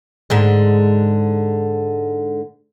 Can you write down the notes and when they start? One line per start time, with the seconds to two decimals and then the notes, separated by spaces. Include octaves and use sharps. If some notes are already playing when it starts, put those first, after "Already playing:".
0.30 G#2 D3 G#3